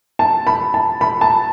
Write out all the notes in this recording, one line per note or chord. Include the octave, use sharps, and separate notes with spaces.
A5
B5
A5
B5
A5